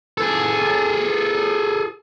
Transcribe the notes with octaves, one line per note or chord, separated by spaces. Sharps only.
G#4 A4